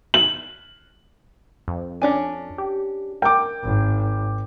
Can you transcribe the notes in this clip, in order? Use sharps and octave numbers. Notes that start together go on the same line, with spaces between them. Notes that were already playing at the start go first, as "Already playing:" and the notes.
F#7
F2
C#4 D4 G#5
G4
A#4 G5 D6
G#1